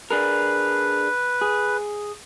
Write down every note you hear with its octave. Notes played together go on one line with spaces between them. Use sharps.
D4 G#4 A#4 B4
G#4